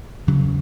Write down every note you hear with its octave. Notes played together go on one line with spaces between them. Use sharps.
E2 C#3 F#3